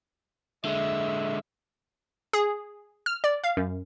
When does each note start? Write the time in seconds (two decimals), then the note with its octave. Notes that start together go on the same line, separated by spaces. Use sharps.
0.65 D3 G#3 E5
2.33 G#4
3.06 F6
3.24 D5
3.44 F5
3.57 F#2